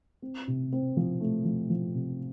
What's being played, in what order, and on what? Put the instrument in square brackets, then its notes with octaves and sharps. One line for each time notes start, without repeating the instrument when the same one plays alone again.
[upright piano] C4
C3
C4
F3
A3
F3
F3
C3